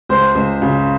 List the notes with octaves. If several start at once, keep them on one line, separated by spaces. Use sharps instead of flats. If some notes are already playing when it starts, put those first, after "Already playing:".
C#2 C5
C#2
C#3